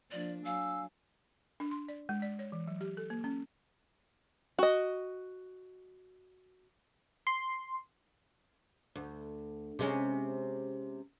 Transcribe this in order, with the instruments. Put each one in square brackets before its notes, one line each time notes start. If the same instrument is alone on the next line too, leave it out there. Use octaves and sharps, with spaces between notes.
[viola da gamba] F3 A#3 D4 [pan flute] D5
[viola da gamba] F#3 [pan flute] F5 [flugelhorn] G#5 [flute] E6
[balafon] D4
C6
D5
G#3
D5
C#5
E3
F#3
G4
A4
A#3
C#4
[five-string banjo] F#4 D#5
[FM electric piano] C6
[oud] D2
C3 G#3 C#4